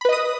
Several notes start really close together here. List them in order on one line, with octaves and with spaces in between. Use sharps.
B5 B4 D#5 D#6